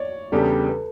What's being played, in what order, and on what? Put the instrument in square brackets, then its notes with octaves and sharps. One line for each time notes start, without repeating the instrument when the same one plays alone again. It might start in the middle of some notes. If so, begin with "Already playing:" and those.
Already playing: [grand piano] C#5 D5
[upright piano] E2 C#3 G3 D4 G4 [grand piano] A4
[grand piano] B4